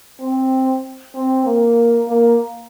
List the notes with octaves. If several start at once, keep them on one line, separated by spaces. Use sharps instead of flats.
C4
C4
A#3
A#3